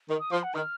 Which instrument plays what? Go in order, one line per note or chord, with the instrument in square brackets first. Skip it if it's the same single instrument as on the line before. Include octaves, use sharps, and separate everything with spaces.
[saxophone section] D#3
[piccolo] D#6
[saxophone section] F3 [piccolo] C6
[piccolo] F#5
[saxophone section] D#3 [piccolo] F6